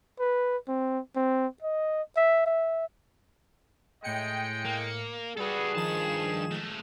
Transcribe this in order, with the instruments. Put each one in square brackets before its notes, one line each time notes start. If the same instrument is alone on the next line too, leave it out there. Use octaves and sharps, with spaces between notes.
[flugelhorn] B4
C4
C4
D#5
E5
E5
[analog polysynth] A2 C#7 [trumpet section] G#3 D#5 G5
[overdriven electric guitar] A#3
[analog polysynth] G3 B4 [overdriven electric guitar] F#4 A4 [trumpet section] G#4
[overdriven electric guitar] G2 A5 [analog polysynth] D#3 F3 E7
[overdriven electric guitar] G#3 A3